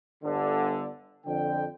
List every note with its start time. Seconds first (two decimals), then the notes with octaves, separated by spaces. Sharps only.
0.24 G1 D3
1.26 F2 D3 G5